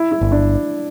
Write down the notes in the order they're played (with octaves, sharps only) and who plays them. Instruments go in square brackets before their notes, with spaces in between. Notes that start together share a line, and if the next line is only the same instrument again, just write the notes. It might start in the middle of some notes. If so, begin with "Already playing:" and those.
Already playing: [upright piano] E4
E4
[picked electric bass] G1
[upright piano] D4